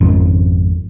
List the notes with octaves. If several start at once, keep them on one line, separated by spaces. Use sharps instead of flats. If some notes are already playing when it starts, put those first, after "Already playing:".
G#1 F2